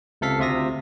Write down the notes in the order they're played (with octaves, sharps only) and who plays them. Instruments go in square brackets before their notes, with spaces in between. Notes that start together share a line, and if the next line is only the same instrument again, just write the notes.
[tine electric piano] C#2 C3 A4 F5 B6
D2 C3 F4 E5 D#6 A#6